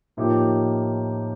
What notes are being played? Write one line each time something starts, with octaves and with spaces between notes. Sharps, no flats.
A2 F3 A#3 D#4 G4